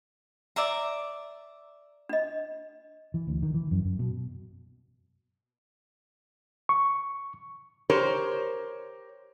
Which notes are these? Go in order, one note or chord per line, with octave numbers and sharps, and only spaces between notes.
D5 E5 A#5
D4 D#5
E3
D2
D#3
E3
F#2
F#2
B2
C#6
G4 A#4 C5 C#5